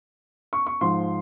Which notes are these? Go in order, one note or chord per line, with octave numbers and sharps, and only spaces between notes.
C#6
C#6
G#2 F3 C6